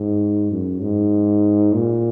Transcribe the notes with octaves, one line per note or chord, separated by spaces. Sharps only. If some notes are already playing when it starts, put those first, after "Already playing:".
Already playing: G#2
F#2
G#2
A#2